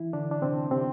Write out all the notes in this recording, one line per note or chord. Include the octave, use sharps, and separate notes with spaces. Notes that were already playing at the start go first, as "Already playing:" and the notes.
Already playing: E3 E4
D3 D4
D4
C3 C4
C3 C4